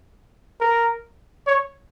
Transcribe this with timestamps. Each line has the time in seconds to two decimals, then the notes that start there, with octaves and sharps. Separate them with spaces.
0.60 A#4
1.47 C#5